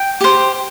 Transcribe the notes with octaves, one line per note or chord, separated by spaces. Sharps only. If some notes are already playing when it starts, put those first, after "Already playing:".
Already playing: G5
G4 C5